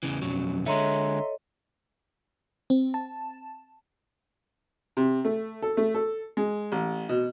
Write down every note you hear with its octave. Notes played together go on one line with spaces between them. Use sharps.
E2 C#3 E3
B1 F2 F#3 C#4
D3 G#3 A4 C#5 D#5 E5 A#5 C6
C4
A5
C3
A3
A4
A3
A4
G#3
A1
B2